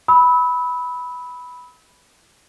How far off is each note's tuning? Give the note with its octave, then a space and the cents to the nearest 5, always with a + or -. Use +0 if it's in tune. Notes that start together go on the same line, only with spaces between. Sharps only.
B5 +0 E6 -35